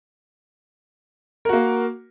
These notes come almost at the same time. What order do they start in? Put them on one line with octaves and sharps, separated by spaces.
A#4 F#4 A#3